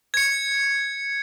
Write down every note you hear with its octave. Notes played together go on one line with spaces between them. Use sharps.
G#6 C#7